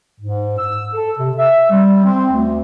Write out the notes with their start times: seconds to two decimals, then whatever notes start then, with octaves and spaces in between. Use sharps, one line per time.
0.21 G#2
0.59 E6
0.94 A4
1.18 C3
1.37 E5
1.70 G3
2.05 C4
2.31 D2